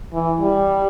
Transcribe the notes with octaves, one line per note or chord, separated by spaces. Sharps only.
E3
G3